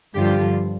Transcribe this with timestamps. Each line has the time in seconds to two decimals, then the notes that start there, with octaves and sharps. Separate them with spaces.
0.15 G2 D3 F3 D4 F4 G4